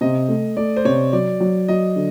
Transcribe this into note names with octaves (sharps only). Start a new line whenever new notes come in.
C3 D#5
A3
A3 D5
C5
C3 C#5
F#3 D5
F#3
F#3 D#5
D3